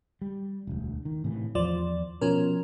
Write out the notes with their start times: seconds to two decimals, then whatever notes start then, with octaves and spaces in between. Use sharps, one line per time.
0.22 G3
0.67 E1 D2
1.05 D#3
1.24 A2 C3 E3
1.55 E2 F3 D5
2.21 B2 F3 C#4 A#4